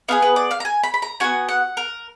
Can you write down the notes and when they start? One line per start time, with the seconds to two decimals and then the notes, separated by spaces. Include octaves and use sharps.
0.08 B3 D4 G#4 F5
0.22 B4
0.36 D5
0.51 F5
0.60 A#5
0.65 G#5
0.83 B5
0.94 B5
1.02 A#5
1.20 B3 D4 F#4 G#5
1.49 F#5
1.77 A#4